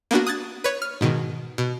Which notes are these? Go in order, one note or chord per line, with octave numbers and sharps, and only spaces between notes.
A#3 B3 D4 F#4
D#6 F#6 G#6 A6
B4 C#5
F6
G#2 B2 D#3
B2